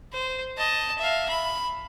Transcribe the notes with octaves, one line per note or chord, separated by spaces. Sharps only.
C5
D#5 A5
E5 F5
B5